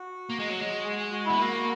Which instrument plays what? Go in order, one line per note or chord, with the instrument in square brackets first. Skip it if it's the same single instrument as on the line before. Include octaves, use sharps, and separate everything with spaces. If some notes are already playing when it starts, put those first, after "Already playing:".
Already playing: [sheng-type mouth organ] F#4
[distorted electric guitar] A#3
G#3
F#3
G#3
[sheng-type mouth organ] G#4
G#4
F#4
[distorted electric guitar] B3 [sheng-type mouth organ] E4
[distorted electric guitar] A#3 [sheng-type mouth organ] F#4